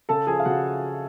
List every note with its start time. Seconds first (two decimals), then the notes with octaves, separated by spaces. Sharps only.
0.09 C#3 A4 A5
0.27 F3 G#4 G#5
0.40 F5
0.45 C#3 F#4 F#5